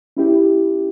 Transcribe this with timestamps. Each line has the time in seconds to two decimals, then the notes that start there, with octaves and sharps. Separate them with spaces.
0.17 C#4 E4 G4